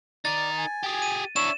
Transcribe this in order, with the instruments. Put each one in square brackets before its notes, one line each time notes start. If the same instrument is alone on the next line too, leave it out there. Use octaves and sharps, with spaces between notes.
[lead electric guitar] D#4 A#4 [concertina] D5 [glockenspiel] A6
[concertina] G#5
[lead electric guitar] G4 G#4
[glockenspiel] D#7
[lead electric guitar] D4 E4 [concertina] C#5 E5 C#6 [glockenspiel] E7